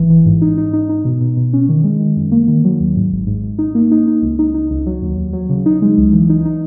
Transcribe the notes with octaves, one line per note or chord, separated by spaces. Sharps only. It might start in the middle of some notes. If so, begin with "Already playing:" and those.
Already playing: G#1 E3
E3
G#2
D#4
D#4
D#4
D#4
B2
B2
B2
C#4
D#3
G#3
D#3
F#2
A#3
D#3
F#3
D#2
G#2
G#1
G#2
G#2
D#4
A#3
D#4
D#4
C#2
D#4
D#4
C#2
F#3
D#2
D#2
F#3
C#3
D#4
G#3
C#2
E3
D#4
D#4